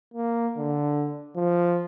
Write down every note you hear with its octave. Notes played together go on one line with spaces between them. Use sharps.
A#3
D3
F3